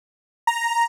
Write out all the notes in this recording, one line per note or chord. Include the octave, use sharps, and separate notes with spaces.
A#5